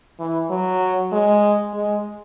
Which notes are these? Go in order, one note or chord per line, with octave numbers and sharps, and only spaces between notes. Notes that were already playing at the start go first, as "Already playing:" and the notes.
E3
F#3
G#3
G#3